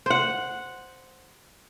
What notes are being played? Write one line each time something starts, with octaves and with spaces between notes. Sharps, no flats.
C5 F#5